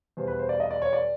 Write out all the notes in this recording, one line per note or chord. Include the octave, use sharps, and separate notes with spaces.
E2 B2 G3 C5
B4
C5
D5
D#5
D5
C#5
D5